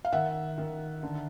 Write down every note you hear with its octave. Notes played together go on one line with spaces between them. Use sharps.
F5
D#3 E5 F#5
D#3
D3